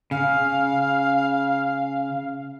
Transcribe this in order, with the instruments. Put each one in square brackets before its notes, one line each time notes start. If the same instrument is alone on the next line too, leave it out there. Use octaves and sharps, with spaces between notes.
[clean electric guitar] C#3 [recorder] F5